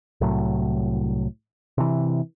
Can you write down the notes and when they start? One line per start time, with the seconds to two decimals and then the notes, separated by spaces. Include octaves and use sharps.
0.21 C2 A2 F#3
1.78 C3 E3